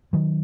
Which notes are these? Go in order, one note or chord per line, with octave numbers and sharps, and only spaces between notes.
D#3 F#3